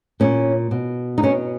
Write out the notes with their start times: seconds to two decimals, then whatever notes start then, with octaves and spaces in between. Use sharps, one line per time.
0.20 A#2 C#4
0.71 B2
1.18 D#4
1.22 B2 C#4